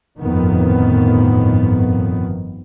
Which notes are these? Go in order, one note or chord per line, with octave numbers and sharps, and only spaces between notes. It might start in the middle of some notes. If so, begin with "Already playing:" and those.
G1 F2 A2 D#3 B3